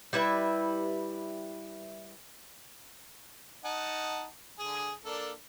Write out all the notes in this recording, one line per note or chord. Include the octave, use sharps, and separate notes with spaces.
G3 E4 B4 E5
D#4 F#5 A5
D3 G#4 G#5
A#3 D4 A4